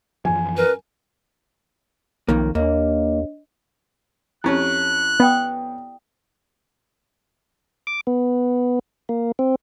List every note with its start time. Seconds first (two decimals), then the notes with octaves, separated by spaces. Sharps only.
0.25 F#2 E3 F3 G#5
0.57 A#4 B4
2.29 B1 F2 D#3 A#3
2.55 D#2 A#3 D4 C#5 D#5
4.44 F2 C#4 E4 G4 A5 F#6
5.20 B3 D5 G5 D#6
7.87 D6
8.07 B3
9.09 A#3
9.39 C4